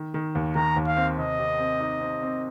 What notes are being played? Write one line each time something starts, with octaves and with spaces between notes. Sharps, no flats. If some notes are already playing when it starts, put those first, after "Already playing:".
Already playing: D#3
D#3
D#2
D#3 A#5
D#2
F5
C4
C3 D#5
C3
C4
D#4
C4
C4